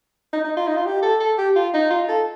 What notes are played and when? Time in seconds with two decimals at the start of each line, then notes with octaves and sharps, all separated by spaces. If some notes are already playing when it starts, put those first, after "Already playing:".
0.33 D#4
0.45 D#4
0.57 F4
0.68 D#4
0.77 F4
0.86 G4
1.03 A4
1.20 A4
1.38 G4
1.56 F4
1.74 D#4
1.91 F4
2.09 A4